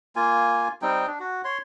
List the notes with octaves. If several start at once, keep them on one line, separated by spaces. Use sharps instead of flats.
A#3 F4 G#5
G3 C4 D#4 G5
D4
F#4
C#5 C6